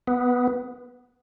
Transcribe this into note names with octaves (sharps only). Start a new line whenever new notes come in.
B3